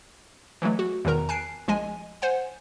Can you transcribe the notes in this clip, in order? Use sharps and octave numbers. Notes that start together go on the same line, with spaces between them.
E3 F#3 G#3 A3
F#4
E2 B2 D#3 A#4 A#5
G#5 A5 F#6 C7 D7
A#1 G#3 D#5 G#5
C5 F#5 G#5